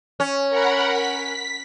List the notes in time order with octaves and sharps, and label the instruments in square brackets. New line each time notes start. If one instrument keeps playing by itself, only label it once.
[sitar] C#4
[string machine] A#4 F#5 B5
B6